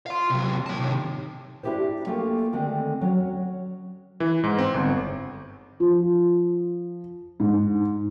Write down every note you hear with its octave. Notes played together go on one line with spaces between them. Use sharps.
F5 C6
C3 F#3
C#5 A5
C3 D#3
D4 E4 G4 G#4 C5
A3 A#3 F4 G4 A4 G#5
D3 D#3 G#3 A3 C4 D#4
F#3 C#4 C#5
E3
G#2
C4
G1
F3
G#2